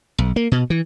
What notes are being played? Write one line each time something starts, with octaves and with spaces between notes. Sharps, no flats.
B1
A#3
B2
E3